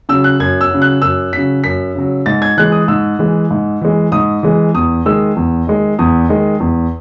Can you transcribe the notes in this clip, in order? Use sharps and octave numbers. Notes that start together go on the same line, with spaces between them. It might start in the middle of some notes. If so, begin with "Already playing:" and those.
C#3 F#3 E6
F#6
F#2 G#6
E6
C#3 F#3
F#6
F#2 E6
C#3 F#3 B6
F#2 B6
C#3 F#3
G#2 A6
G#6
E3 G#3 F#6
D#6
G#2 E6
E3 G#3
G#2
E3 G#3
G#2 D#6
E3 G#3
E2 D#6
D#3 G#3 E6
E2
D#3 G#3
E2 D#6
D#3 G#3
E2